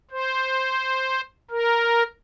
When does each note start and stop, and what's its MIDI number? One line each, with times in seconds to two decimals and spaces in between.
0.11 1.21 72
1.51 2.03 70